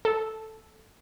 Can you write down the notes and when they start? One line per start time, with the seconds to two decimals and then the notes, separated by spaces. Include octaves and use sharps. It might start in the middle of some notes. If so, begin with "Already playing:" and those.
0.05 A4